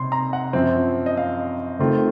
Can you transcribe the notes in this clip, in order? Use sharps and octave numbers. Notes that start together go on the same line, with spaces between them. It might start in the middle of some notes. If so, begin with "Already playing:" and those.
Already playing: C3 C6
A#5
F#5
F#2 F3 C4
D#5
F5
D#3 A3 C4 F4